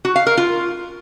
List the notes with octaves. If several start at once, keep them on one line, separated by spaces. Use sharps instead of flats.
F#4
F5
A#4
F4